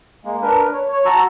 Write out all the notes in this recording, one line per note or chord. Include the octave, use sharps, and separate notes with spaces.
G#3 A#3
D4 A#4 B4
C#5
C#5
F#4 A5 A#5 C#6 E6